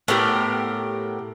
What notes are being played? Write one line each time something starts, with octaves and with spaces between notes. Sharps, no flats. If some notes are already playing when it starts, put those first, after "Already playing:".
A2 B3 G4 A#4